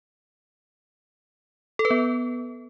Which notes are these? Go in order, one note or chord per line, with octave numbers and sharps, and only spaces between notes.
A4
B4
B3